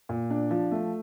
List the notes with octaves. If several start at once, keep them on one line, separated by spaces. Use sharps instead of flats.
A#2
D4
F3
A3